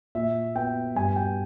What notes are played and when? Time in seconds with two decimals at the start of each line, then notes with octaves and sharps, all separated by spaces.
0.15 A#2 E5
0.55 B3 G5
0.95 G2 G#5
1.16 G5